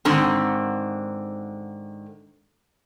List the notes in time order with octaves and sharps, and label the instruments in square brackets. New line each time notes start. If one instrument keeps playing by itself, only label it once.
[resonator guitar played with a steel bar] G#2 D3 D#3 C4